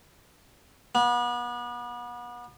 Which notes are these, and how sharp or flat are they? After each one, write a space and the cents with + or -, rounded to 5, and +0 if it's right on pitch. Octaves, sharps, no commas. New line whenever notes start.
B3 -35